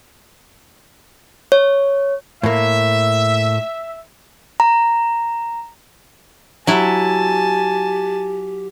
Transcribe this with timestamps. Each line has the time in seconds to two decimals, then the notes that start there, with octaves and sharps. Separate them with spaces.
1.52 C#5
2.43 A2 A#3 E5
4.60 A#5
6.67 F#3 E4 G4 G#5 A5